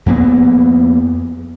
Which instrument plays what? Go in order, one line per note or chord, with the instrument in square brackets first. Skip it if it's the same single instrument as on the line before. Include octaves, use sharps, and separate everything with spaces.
[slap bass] F2 A#3 B3